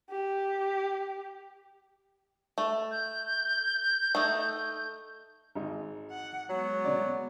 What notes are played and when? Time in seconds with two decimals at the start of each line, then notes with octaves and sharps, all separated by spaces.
0.10 G4
2.58 A3
2.91 G6
4.15 A3 D#4
5.55 G#1 D#5
6.11 F#5
6.49 F#3 G#3 B3
6.85 B2 D5